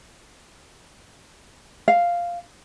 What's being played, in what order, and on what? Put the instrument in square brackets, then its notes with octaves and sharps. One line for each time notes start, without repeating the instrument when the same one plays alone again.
[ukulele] F5